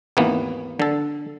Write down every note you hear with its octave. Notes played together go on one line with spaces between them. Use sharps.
G#1 D#2 E3 A#3 B3
D3 A4